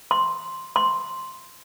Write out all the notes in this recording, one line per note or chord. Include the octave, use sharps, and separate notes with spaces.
C6
C6